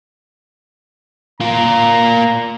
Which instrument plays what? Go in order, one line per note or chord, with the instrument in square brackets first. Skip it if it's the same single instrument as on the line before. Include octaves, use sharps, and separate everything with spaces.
[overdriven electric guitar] A#3 F4 [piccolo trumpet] A#5